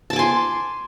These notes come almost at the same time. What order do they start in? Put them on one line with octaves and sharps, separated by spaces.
A5 D6 G#5 C6